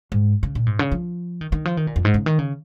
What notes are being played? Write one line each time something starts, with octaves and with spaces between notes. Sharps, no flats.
G#2
C#3
A#2
G#2
C#3
F3
D#3
D#3
F3
D#3
A#2
F2
G#2
C#3
D#3
C#3